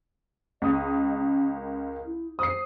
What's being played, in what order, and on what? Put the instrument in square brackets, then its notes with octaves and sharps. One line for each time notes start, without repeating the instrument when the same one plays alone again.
[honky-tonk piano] C#2 D#6 [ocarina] D#5
[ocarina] C#4
A#4
E4
[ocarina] C5 [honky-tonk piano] D#6 C7